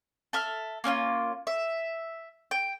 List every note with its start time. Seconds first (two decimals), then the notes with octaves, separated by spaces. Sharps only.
0.33 A4 E5 F6
0.84 A#3 C#4 E4 F4
1.47 E5
2.51 G5